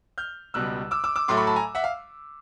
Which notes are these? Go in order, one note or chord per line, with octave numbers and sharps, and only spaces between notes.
F6 G6
C#2 B2 G3 E6 F#6
D6 E6
D6 E6
D6 E6
A2 F#3 A3 C6 D6
B5 C#6
A5 B5
G#5 A#5
E5 F#5
F5